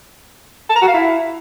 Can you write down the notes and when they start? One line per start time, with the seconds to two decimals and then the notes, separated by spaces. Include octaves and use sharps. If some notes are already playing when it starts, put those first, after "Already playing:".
0.70 A5
0.76 A#5
0.82 F#4
0.88 F5
0.94 E4